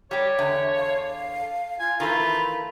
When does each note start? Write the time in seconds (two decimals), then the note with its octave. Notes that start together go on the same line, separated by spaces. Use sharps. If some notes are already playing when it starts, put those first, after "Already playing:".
0.11 G3 G4 C#5
0.39 E2 D3 E5
0.76 F5
1.79 F4 G#5
2.00 D#3 E3 A3 F4 B5